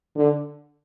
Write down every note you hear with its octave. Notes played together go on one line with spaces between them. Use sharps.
D3